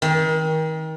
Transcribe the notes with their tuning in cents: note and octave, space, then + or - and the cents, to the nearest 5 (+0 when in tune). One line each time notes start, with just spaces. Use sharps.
D#3 +30